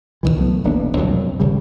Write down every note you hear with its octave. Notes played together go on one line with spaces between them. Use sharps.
E2 C3 D#3 E3
C2 F#3 A3 B3
E1 A#3 B3 D4
C2 F2 B2 F#3
G#1 C#3 G3